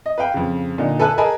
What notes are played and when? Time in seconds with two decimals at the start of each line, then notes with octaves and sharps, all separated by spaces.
0.06 D#5
0.18 B4 F5 G5 B5
0.34 F2 C#3
0.78 A#2 D3 D#4
1.00 A4 B4 E5 G#5 A5 F#6
1.18 G#4 A#4 D#5 G#5 A5 B5